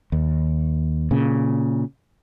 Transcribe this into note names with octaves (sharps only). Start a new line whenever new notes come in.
D#2
A#2 C#3